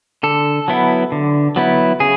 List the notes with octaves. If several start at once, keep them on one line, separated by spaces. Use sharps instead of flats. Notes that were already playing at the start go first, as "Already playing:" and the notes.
D3 A4
F#3 B3 E4
D3
F#3 B3 E4
C#3 G#4